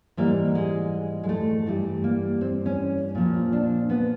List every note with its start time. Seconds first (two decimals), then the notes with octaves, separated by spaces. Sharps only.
0.17 G#2 E3 G3 A#3
0.55 G#3
1.23 G#3
1.29 A3
1.66 G2 E3 G3
2.04 A#3
2.41 C4
2.66 C#4
3.15 A#2 F3
3.53 D4
3.90 B3